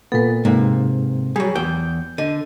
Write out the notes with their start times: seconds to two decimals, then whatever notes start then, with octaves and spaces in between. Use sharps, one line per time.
0.12 A#2 B3 A4 B4
0.45 G#2 C3 A#3
1.36 F#3 G3 G#4
1.55 E2 G5 G6
2.18 D3 D#5